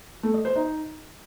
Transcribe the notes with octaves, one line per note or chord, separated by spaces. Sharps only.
A3
D#5
C5
D#4